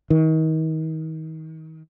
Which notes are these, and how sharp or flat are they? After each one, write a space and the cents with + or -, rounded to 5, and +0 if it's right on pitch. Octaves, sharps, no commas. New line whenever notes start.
D#3 +35